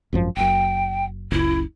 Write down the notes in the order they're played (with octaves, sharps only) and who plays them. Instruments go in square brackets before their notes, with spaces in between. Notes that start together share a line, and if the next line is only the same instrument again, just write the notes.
[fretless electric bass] G#1 F#2 F3
[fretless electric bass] F#1 F#2 [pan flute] G5
[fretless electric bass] F#1 C#2 [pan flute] E4